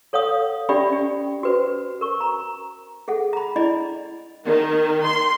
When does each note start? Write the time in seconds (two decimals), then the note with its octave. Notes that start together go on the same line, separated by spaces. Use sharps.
0.13 A4 C#5 F5 F#5 D#6
0.69 D4 G4 D5 E5 G5 B5
0.90 C#4 G5
1.43 F#4 B4 C5
2.01 A#4 C#6
2.21 A#5
3.08 G#4 A4 F#5
3.33 A#5 B5
3.56 D4 E4 D5 D#5 G#5 B5
4.45 D#3
5.04 C6